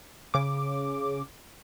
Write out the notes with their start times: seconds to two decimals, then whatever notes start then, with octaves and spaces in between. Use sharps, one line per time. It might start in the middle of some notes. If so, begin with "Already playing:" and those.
0.34 C#3 D6